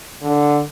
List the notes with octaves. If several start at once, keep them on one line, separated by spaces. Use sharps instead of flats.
D3